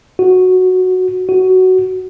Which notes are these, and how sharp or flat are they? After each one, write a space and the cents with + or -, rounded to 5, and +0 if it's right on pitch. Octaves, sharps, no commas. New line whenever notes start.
F#4 -5
F#4 +10